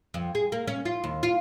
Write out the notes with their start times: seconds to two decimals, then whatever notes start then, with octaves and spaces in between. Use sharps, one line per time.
0.14 F2
0.35 G#4
0.52 A#3
0.68 C#4
0.85 F4
1.04 D#2
1.23 F4